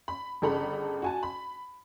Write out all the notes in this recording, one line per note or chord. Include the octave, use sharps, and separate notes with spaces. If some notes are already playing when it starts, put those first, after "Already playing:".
B5
G1 C#3 A4 A#5 B5
F#4 G#5 A5
B5